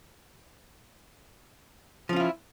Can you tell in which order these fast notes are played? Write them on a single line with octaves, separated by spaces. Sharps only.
F3 C#4 F4 E4